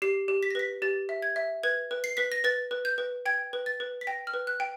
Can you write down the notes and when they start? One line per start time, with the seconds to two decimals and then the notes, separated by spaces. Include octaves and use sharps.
0.02 G4 C7
0.28 G4
0.43 B6
0.50 A#6
0.55 B4 B6
0.82 G4 A6
1.09 E5
1.22 G#6
1.36 E5
1.63 B4 G#6
1.91 B4
2.04 C7
2.17 B4 B6
2.32 A#6
2.44 B4 A6
2.71 B4
2.85 G6
2.98 B4
3.26 G5 G#6
3.53 B4
3.66 A6
3.80 B4
4.01 B6
4.07 G5 A#6
4.27 F6
4.34 B4
4.47 F#6
4.60 G5